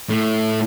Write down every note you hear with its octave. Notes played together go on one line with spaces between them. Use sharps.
A2